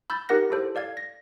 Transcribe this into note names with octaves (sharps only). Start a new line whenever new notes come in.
B5 E6 G6 A6
D#4 G4 A#4 F#5 F#6 A#6
E4 G4 A4 C5
A4 D5 F5 G#6
A#6